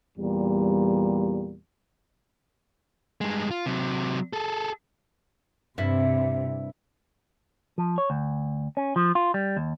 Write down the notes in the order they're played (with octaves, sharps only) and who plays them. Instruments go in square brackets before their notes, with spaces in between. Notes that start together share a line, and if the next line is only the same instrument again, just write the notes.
[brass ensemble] E2 A#2 G3
[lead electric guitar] G2 G#3
F4
C3 F#3
G#4 A4
[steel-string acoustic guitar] G2 [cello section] C3 [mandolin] E4
[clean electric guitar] F3
C#5
D2
C#4
F3
F4
G3
D#2